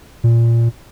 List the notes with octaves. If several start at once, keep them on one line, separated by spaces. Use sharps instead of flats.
A#2